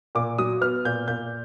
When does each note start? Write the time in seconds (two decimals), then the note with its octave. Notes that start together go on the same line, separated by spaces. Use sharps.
0.15 A#2 D6
0.38 F#3 D#6
0.61 B3 F6
0.85 A#2 G6
1.08 A#2 G6